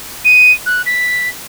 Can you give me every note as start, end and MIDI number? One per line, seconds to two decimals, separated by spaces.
0.25 0.52 99
0.66 0.82 90
0.86 1.28 95